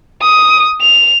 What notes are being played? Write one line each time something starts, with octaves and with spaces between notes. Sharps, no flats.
D#6
F7